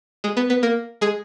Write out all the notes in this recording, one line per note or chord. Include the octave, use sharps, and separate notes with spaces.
G#3 G#4
B3 B4
B3 B4
A#3 A#4
G#3 G#4